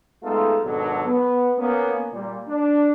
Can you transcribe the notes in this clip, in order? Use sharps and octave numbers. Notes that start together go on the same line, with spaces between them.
G#3 A3 B3 D#4 F4 A4
G#1 B2 F#3 D4 A4
B3
A#3 B3 C#4
A#2 G3
D4